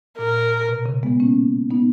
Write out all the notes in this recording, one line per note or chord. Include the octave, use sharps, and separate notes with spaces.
A#2 A#4
B2
C#3
G#3 B3
A#3 C#4
B3 D#4